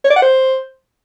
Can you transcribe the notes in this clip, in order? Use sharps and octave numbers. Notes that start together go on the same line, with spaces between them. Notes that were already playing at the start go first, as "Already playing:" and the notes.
C#5
D5
F#5
C5